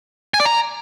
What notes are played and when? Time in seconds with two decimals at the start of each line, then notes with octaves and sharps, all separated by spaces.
0.34 G#5
0.40 D5
0.45 A#5